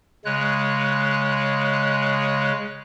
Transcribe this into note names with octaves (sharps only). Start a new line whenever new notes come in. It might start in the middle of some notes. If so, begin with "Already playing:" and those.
C#3 G#3 C#5 F#6